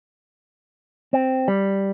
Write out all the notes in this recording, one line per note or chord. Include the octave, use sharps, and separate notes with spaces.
C4
G3